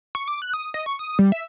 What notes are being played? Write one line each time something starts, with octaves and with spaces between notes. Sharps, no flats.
C#6
D6
F#6
D#6
D#5
C#6
D#6
G3
E5